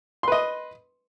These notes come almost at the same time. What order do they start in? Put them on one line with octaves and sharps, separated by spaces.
C6 B4 D#5